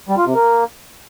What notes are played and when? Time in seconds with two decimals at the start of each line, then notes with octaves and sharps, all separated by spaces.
0.09 G3
0.17 F4
0.26 C3
0.34 A#3